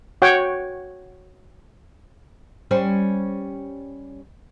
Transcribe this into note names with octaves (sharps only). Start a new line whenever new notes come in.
F#4 C#5 F#5 G5
G3 C#4 C5